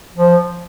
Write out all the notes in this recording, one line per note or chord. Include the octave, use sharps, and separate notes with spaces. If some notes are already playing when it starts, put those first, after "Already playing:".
F3